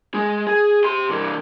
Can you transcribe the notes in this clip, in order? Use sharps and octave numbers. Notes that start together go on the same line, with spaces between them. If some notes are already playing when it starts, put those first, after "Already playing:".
G#3 G#4
G#4
G4 C6
C3 E3